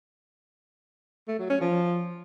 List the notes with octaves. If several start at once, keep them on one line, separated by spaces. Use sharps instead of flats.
A3
F#3
C#4
F3